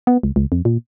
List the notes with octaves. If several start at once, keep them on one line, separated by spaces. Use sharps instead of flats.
B3
C#2
C#2
F2
A#2